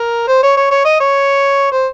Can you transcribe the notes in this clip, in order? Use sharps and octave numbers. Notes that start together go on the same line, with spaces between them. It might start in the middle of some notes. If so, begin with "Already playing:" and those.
Already playing: A#4
C5
C#5
C#5
C#5
D#5
C#5
C5